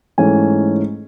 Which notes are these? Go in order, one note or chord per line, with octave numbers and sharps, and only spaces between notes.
G#2 E3 A3 C#4 G#5